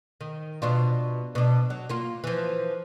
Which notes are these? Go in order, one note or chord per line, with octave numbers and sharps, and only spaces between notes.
D#3
B2 D4 F4
B2 D4
F#3
A#3 F4
E3 F3